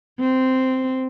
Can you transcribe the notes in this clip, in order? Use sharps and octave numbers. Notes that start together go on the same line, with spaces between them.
C4